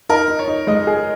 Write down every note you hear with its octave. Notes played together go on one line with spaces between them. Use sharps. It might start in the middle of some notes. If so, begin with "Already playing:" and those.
D#4 A#4
D#4
C#5
D#4
G#3 D#5
G#4